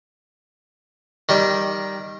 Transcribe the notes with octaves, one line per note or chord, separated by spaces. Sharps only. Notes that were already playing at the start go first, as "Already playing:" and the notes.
D#3 G3